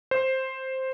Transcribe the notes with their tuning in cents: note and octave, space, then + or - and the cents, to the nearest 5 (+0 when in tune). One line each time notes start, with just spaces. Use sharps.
C5 +5